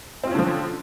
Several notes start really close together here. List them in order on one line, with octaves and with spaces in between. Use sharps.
C4 F4 C#4 D3 F3